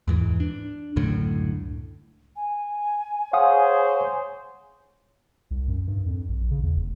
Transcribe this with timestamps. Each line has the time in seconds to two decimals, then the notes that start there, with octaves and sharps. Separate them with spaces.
0.08 E2 G#2 E3
0.40 D4
0.96 C#2 F#2 A2 D3
2.36 G#5
3.33 G#4 C5 C#5 F5 F#5 D#6
5.51 C2
5.68 F#2
5.88 G2
6.06 F2
6.29 A#1
6.51 C#3
6.63 E2
6.76 F1